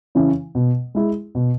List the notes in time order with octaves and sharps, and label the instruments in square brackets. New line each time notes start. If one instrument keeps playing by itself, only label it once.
[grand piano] C#3 E3 C#4 E4
B2
G#3 E4 G#4
B2